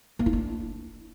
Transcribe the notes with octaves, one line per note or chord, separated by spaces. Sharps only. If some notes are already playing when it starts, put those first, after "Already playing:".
A#3
E4
D4